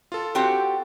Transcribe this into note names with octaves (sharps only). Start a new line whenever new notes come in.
F4 A4
C4 F#4 G4